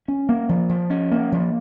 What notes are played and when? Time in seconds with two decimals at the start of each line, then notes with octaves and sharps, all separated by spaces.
0.08 C#4
0.29 A#3
0.49 F3
0.69 F3
0.90 C#4
1.12 A#3
1.32 F3